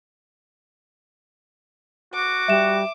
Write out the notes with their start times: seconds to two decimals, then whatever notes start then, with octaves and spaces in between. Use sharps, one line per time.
2.14 F#4 D6
2.48 G3 E5 E7